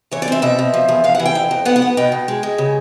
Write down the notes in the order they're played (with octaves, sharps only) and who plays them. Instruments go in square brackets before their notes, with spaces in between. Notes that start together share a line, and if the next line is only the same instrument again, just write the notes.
[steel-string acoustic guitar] E3 C#5
D5
C4 E5
B2 E5
B2
F3
E2
E2 F5
F#5
E3
G5
F2
F2
B3 F#5
F#5
B3
B2 G5
B2
G#3
G#3
C#3